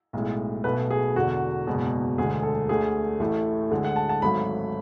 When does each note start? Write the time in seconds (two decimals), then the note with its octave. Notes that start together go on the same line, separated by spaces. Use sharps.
0.13 B1 A2 G#3
0.64 B1 B2 A3 B4
0.90 G#4
1.15 E1 E2 D3 F#4
1.67 F#1 E2 B2 G#3
2.18 E1 D2 D3 G#3 G#4
2.43 A4
2.69 D2 D3 A3 G#4
3.20 A1 A2 E3 A3
3.71 D2 D3 G#3
3.84 F#5
3.96 A5
4.09 A5
4.22 G#1 G#2 F#3 A3 B5